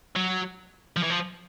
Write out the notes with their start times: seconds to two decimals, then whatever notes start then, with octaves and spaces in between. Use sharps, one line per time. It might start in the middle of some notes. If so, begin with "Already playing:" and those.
0.16 F#3
0.96 F3
1.03 E3
1.10 F3